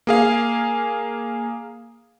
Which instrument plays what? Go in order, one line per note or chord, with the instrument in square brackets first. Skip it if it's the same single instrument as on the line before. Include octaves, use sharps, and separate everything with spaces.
[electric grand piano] A#3 G#4 F5